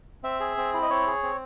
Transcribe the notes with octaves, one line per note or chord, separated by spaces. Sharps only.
C4 E5
G#4
C4
E4
D#5
C4 C#5
G#4
C4